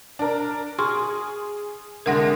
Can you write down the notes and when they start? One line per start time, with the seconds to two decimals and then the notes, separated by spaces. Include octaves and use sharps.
0.19 D4 A#4
0.79 G#4 C6 C#6 F6
2.06 C2 D3 G#3 A#4 F#5 A#6